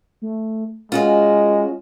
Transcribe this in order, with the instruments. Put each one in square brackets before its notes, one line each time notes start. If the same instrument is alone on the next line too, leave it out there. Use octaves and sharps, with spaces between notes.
[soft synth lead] A3
[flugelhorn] G#3 [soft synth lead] C#4 [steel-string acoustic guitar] F4 F#4 D#5